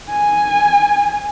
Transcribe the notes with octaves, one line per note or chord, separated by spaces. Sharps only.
G#5